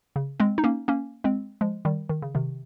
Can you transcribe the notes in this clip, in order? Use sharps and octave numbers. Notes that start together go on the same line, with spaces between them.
C#3
G#3 C4
D#4
A#3 C#4
A#3 C#4
G#3 C4
F3 G#3
D#3 G3
D#3
C#3
C3 D#3